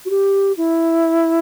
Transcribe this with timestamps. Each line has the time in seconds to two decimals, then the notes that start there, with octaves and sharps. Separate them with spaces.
0.05 F#4
0.10 G4
0.57 E4